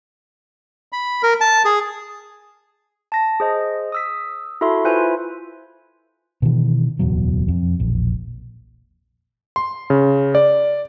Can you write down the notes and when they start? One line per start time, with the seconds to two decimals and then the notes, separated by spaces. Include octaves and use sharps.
0.92 B5
1.23 A#4
1.41 A5
1.65 G#4
3.12 A5 A#6
3.40 G#4 C5 D#5
3.92 D#6 E6 B6
4.61 E4 F#4 A4 E5 C6
4.85 E4 F4 B4 C5 E5 G#5
6.42 B2 D#3 E3
6.99 D1 E2 B2 F#3
7.48 F2
7.80 E1 A#1
9.56 C6
9.90 C#3
10.35 D5